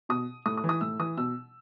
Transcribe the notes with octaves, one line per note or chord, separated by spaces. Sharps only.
B2 D#6
A2 D#6
D#6
E3
D#6
A2 E6
E3 D#6
B2 E6